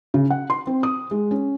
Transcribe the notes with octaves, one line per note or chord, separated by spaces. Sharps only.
C#3
F#5
C6
C4
D#6
G#3
C#4